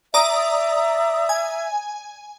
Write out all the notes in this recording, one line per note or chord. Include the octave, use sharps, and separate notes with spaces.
D5 E5 A#5 D#6
G#5